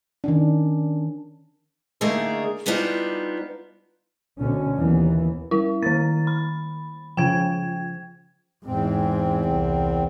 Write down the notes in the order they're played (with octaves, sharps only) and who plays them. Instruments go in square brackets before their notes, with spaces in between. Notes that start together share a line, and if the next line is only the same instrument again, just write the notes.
[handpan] D#3 C#4 D4
[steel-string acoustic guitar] D3 A3 A#3 D#4 G#4 A#4
G3 B3 D4 D#4 F4
[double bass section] D2 B2 D3 C#4
D#2 E3 B3
[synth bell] G3 E4
[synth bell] D#3 A6 [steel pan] A#3
[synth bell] B5
[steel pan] C#3 F3 [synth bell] G5 G#6
[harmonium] E2 C4 [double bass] G#2
[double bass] C2